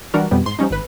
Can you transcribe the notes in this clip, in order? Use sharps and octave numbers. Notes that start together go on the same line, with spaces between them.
E3 G3 D4 F#4 A#4
F2 B2 G3 B3
G#2 C6
F3 G3 C#4 D#4
G#1 B4